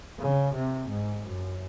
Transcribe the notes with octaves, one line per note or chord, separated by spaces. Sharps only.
C#3
C3
G#2
F#2